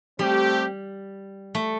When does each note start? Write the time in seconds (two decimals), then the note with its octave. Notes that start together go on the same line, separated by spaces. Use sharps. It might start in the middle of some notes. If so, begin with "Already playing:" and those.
0.19 G3 A3 C4 G4
1.55 A3